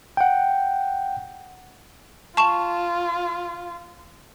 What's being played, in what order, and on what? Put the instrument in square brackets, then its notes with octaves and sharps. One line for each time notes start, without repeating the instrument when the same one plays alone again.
[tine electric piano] F#5 G5
[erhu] F4 [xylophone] A5 C#6 E7